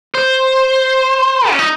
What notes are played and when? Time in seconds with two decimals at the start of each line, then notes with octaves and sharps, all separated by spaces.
0.14 C5
1.50 C#4
1.59 D#4